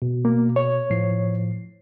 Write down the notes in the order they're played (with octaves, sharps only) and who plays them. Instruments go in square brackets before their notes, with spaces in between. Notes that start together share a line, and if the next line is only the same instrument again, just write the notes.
[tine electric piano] B2
[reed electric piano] A#3
C#5
[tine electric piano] A2 F3 C7